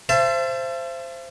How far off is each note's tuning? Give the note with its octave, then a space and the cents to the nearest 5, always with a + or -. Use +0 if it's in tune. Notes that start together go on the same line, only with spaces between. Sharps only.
C5 +0 E5 +45 A5 +0